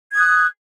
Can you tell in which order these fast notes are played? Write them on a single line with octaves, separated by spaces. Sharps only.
G#6 D#6 F#6